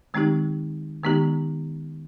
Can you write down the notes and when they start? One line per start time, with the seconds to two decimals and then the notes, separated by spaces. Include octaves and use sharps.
0.14 D#3 G#3 C4 D#4 G4
1.04 D#3 G#3 B3 D#4 G4